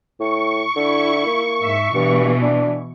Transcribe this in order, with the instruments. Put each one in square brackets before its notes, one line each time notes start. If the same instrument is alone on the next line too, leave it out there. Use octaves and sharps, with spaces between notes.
[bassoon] A2 [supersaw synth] C#6
[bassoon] D3 [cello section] E4
[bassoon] A#3
[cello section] G#2 E5
[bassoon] G2 [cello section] B2 E3
[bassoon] D4